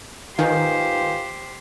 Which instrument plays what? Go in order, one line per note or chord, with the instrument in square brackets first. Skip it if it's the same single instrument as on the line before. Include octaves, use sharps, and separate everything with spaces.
[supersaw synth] D#3 [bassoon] F4 [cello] G4 C5 [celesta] B4 G#5 G6